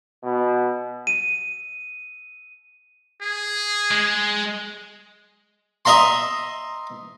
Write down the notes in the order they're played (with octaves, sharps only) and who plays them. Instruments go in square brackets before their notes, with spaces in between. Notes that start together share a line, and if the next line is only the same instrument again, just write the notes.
[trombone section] B2
[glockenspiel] D#7
[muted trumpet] G#4
[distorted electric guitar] G#3
[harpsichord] D#5 E5 A#5 C6